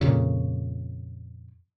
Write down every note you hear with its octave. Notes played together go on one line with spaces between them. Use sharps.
F2 A#2 C#3